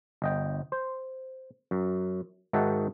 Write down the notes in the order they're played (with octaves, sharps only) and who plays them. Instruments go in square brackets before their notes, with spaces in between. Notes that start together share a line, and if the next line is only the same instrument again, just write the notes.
[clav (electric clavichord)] G1 D#5 G5
C5
F#2
G#2 D#3 F#4 E5 F#5 A5